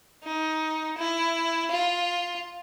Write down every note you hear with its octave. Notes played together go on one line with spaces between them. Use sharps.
D#4
E4
F4